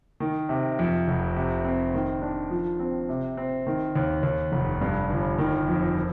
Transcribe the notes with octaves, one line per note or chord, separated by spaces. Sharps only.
D#3
C3
F2
F1
C3
C4
D#3
D4
F3
C4
C3
C4
D#3
D#2
D#2
F1
G2
G1
D#3
F2
F3